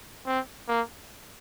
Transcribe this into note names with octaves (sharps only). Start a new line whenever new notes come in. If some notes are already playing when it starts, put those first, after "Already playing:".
C4
A#3